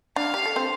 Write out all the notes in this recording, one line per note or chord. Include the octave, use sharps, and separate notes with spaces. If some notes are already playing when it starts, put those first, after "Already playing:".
D4 D5 F5
G4
A4
C4 C5